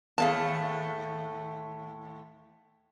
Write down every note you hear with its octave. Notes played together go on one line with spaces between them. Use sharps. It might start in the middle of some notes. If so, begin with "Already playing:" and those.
D#2 A2 A3 G#4 F5 A5